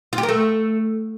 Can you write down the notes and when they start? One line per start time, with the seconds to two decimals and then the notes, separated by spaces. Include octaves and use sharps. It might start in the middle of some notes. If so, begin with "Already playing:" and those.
0.13 F4
0.18 G4
0.23 A#4
0.29 A3